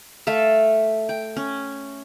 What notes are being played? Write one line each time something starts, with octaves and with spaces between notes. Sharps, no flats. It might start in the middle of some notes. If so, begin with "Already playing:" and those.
A3 A4 E5 F5
G5
C#4